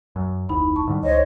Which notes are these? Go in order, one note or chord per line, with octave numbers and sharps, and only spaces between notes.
F#2
F1 D2 D#4 E4 B5
A5 C#6
G#2 D3 G3
C#2 C5 C#5 D#5